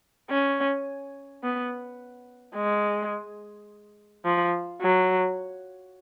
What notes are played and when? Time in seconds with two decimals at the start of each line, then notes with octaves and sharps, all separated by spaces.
0.30 C#4
1.44 B3
2.55 G#3
4.25 F3
4.82 F#3